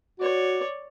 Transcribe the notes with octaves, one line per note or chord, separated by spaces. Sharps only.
F#4 C#5 D5